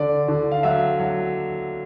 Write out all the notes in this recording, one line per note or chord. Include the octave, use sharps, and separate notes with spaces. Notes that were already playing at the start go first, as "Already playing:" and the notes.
Already playing: D3 D5
D3
F5
F#3 E5
F#3